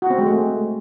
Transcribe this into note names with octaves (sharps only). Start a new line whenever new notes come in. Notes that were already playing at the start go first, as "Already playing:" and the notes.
F#4
C4
G#3
A3